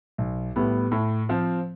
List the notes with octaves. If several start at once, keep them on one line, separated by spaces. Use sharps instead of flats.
B1
A2 G3 B3
A2
F3 C4